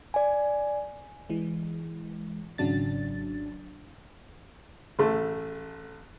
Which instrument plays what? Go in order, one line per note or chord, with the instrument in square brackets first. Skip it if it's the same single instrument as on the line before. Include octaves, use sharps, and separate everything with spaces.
[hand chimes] D5 G#5
[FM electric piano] E3 G#3
G#1 C#3 F#3 D4 A6
[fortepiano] A1 A3